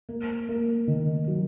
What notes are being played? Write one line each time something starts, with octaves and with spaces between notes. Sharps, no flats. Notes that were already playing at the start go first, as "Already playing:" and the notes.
A#3
A#3
D#3
F#3